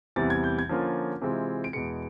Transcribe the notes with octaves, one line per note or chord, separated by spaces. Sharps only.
E2 C3 E3 G3 A6
G#6
G6
G#6
D3 F3 A#3 C#4 F4
C3 E3 G#3 C4 F4
D7
E2 B2 G#3 C#7